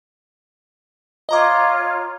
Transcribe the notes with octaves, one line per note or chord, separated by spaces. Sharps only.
F4 C#5 D#5 A#5 D6